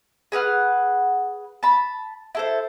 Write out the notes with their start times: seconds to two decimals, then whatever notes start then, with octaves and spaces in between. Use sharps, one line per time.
0.32 G#4 B4 F#5 F6
1.63 A5 B5
2.35 E4 A4 C5